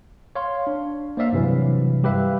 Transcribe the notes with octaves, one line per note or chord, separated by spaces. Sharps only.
C#5 F5 C6
D4
A#3 C5 D5 E5 F5
G2 C3 E3 F#3
G3 G4 B4 E5 F5